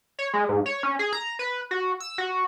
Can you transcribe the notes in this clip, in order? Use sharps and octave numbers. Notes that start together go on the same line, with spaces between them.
C#5
G#3
G#2
C#5
C#4
G#4
A#5
B4
F#4
E6
F#4